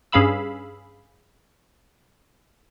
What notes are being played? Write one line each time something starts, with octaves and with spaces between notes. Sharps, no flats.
G2 C#4 G#4 F5 B5 E6